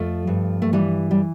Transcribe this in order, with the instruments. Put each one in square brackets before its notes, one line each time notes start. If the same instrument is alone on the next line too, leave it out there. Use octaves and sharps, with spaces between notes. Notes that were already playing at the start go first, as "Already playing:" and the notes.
Already playing: [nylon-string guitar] F2 F3 A3
G2
A3
E3 G3
G3